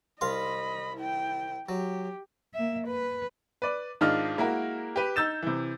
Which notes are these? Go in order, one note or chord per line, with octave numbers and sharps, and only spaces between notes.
C2 D#5 F5 B5 C6
E4 G5
F#3 G4
A#3 E5
B4
B4 D5
G#2 D#3 D4 F4 D#5 F6
G#3 A#3 E4 F#4 A#4
G4 B4
D#4 E6 G6 A6 E7
C3 E3